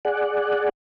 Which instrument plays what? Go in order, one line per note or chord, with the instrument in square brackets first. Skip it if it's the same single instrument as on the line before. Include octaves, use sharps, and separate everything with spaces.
[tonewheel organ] G#4 D5 F#5